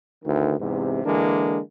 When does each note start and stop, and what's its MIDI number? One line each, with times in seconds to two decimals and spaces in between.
0.24 0.55 38
0.24 0.55 51
0.60 1.01 40
0.60 1.01 44
0.60 1.01 48
1.04 1.60 50
1.04 1.60 52
1.04 1.60 56
1.04 1.60 58
1.04 1.60 62